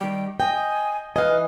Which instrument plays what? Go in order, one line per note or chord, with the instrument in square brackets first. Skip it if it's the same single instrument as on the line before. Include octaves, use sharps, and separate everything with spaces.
[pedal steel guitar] D#3 G3 [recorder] G5
[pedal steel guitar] D#5 [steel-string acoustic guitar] G5 [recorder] G#5
[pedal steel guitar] E3 D#4 G#5 [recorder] B4 [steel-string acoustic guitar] D#5 F5